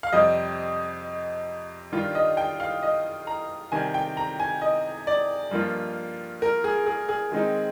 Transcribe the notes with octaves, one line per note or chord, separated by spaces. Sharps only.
F5
F2 C3 G3 C4 D#5
G2 D#3 G3 D4 F4
D#5
G5
F5
D#5
A#5
C3 D#3 G3 G#5
G5
A#5
G#5
D#5
D5
G2 F3 A#3 F4
A#4
G#4
G#4
G#4
D#3 G#3 C4 D#4